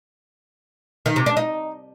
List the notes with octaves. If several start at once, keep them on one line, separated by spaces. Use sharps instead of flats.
D#3
C3
D4
D#4